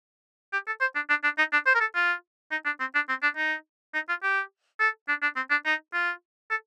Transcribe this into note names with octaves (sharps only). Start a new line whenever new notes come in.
G4
A4
C5
D4
D4
D4
D#4
D4
C5
A#4
A4
F4
D#4
D4
C4
D4
C4
D4
D#4
D#4
F4
G4
A4
D4
D4
C4
D4
D#4
F4
A4